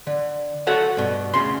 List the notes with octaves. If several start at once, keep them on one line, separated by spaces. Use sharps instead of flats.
D3
F#4 A4 C#5 F#5
G2 B2
D2 C#3 C6